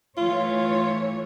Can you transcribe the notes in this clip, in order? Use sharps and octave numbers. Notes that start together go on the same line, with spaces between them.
E3 A3 F4 C#5